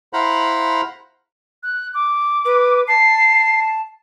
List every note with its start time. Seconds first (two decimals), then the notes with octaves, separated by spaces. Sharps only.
0.13 E4 C5 F5 F#5 A#5 B5
1.63 F#6
1.94 D6
2.45 B4
2.88 A5 C7